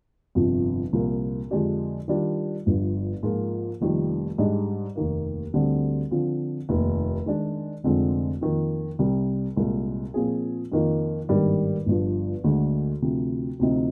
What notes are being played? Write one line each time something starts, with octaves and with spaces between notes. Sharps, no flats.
G1 F2 C3 F3
C2 A#2 F3 A#3
F2 D3 G#3 D4 G4
D#3 G3 D4 F4
G1 G2 F3
G#2 F3 A#3 F4 G#4
F1 F2 D#3 G3 A#3
G#2 G3 D4 G#4 D#5
F1 D#2 D#3 A#3
D2 D3 G3 C4
D3 F3 C4 F4
F1 D#2 D#3
D#3 G#3 D4
F1 F2 D3 G#3 C4
F2 D#3 A#3
C2 C3 G3
C2 A#2 G#3
A#2 F3 C4 F4 G#4
F2 D#3 A#3 D#4
G#1 G2 D#3 G3 A#3
G1 G2 F3
D2 D3 G#3
D2 C3 F3
D2 C3 F3 C4 D#4